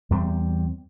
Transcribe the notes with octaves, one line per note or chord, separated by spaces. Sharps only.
E2 G3 C4